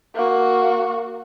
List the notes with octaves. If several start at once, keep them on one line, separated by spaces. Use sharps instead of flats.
A#3 F#4